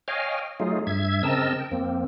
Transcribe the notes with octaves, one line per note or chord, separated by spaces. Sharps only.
C#5 D#5 F5 G5 G#5 F6
F#3 A3 D#4 F4 G#4
G2 E5 G#6
C#3 C4 A#4 D#5 A5 E6
G5
F2 A#3 C4